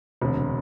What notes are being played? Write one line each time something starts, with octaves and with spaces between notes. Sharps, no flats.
E1 D2 C3